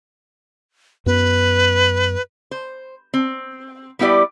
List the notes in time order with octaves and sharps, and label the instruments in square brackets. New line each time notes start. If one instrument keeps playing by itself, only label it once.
[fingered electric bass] F#2 B3 [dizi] B4
[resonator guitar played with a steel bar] C5
C4
G3 B3 E4 G4 D5